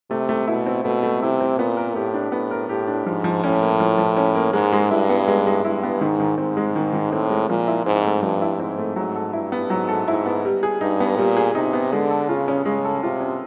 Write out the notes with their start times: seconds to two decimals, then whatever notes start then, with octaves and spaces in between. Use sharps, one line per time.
0.10 C3 A3
0.29 A3
0.48 B2 E4
0.66 C4
0.84 B2 A3
1.03 A3
1.22 C3 E4
1.41 C4
1.58 A#2 B3
1.77 A#4
1.95 A2 G4
2.14 D4
2.32 A2 B3
2.51 A#4
2.69 A2 G4
2.87 D4
3.06 G#2 F3
3.24 F3
3.43 A2 C#4
3.61 A#3
3.80 F3
3.98 F3
4.17 C#4
4.35 A#3
4.53 G#2 G#3
4.72 G#3
4.90 G2 E4
5.10 B3
5.28 G#3
5.47 G#3
5.65 G2 E4
5.83 B3
6.01 G#2 D#3
6.20 D#3
6.38 G#2 C4
6.57 G#3
6.76 D#3
6.93 D#3
7.12 A2 C4
7.31 G#3
7.49 A#2 F3
7.67 E4
7.86 G#2 C4
8.04 A3
8.22 G2 F3
8.42 E4
8.60 G#2 C4
8.79 A3
8.96 G#2 F#3
9.16 A4
9.33 G2 E4
9.52 B3
9.70 G#2 F#3
9.89 A4
10.08 G#2 E4
10.26 B3
10.45 G3
10.63 G#4
10.81 G2 D#4
11.00 B3
11.18 A#2 G3
11.37 G#4
11.55 C3 D#4
11.73 B3
11.92 D3 G#3
12.10 A4
12.29 C#3 F4
12.48 C#4
12.65 C#3 G#3
12.85 A4
13.02 C3 F4
13.21 C#4